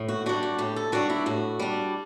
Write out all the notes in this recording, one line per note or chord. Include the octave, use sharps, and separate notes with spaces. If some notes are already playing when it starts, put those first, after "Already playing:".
Already playing: A2
F#4
G3 D4 F#4
F#4
A2 G4
A4
G3 D4 F#4
E4
A2 F#4
G3 D4